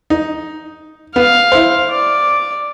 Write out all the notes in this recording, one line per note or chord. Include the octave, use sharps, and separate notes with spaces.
D#4
B3 F5
E4 C5
D5